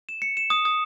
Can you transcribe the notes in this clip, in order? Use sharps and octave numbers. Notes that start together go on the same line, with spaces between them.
E7
C#7
E7
D#6
D#6